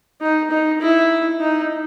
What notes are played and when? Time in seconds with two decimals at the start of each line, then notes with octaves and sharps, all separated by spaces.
0.21 D#4
0.51 D#4
0.81 E4
1.40 D#4